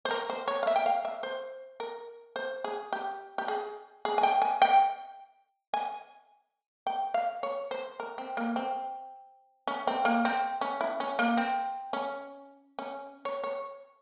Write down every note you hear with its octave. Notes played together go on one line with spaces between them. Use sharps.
C5
A#4
C5
C#5
F5
E5
G5
F5
E5
C5
A#4
C5
G#4
G4
G4
G#4
G#4
G#5
G5
G#5
G5
G#5
G5
F5
C#5
C5
A#4
C4
A#3
C4
C#4
C4
A#3
C4
C#4
E4
C#4
A#3
C4
C#4
C#4
C#5
C#5